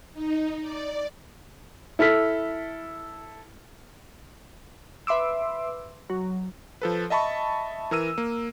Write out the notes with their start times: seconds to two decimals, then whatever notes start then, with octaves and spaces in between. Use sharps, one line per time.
0.13 D#4
0.61 D5
1.99 E4 A4 F6 B6
5.07 B4 E5 C6 D6 E6
6.10 F#3
6.82 F3 A4 B4
7.10 D#5 E5 A5 B5 C#6
7.91 E3 A#4 E6 D#7
8.18 A#3